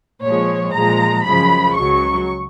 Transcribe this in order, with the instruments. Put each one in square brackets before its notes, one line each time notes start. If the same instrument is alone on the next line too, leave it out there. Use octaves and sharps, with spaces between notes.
[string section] A#2 F3 G#3 C#5
A#2 F3 G#3 A#5
F#2 C#3 F3 G#3 B5
C#2 C#3 F#3 C#6